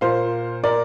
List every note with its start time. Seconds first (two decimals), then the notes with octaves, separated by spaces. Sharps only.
0.01 A#2 A#3 C5 F5
0.64 A#4 D5